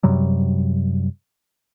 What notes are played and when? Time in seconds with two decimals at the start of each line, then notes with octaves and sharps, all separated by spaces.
0.03 F#2 C3 F#3 G3